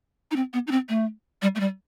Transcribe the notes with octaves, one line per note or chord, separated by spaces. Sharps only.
D#4
C4
B3
D#4
C4
A3
G3
A3
G3